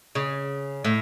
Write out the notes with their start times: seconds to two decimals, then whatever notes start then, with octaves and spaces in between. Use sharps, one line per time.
0.15 C#3
0.84 A2